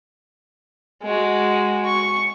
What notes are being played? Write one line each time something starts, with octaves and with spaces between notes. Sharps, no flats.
G#3 F#4
C#6